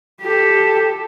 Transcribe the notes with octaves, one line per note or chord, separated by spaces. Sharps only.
G4 A4